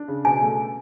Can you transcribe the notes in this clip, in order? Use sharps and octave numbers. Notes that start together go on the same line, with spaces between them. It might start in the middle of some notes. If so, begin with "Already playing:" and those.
Already playing: D4
C#3
B2 G#5
A3